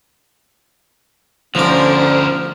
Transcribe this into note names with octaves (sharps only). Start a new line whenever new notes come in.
D2 D3 F3 C#4 A#4 C5 D6